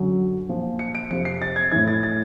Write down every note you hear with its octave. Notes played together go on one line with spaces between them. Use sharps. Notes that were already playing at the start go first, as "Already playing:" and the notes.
Already playing: F#2 D3 F#3
A#2 F3
C#7
D7
F2 C3 F3 C#7
C7
A6
G#6
A2 E3 G#6
A6
A6